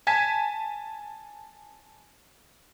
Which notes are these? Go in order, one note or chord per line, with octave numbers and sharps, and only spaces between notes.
G#5 A5 G#6 B6